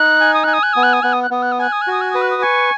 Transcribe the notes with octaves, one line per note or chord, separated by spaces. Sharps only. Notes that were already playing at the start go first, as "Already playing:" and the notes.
Already playing: D#4 F#6
G#5
D#6
G#5 F#6
D#6
F#6
B3 D#6
F#6
D#6
B3 F#6
D#6
F#6
B3 D#6
F#6
D#6
G#5 F#6
D#6
F#6
F#4 D#6
F#6
B4 D#6
F#6
D#6
G#5 C#6